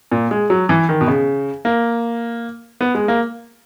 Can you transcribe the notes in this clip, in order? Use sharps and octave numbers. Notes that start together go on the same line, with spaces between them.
A#2
G#3
F#3
E3
D#3
B2
C#3
A#3
B3
G#3
A#3